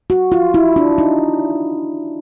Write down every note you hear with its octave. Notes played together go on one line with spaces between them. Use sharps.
F#4
F4
E4
D4
D#4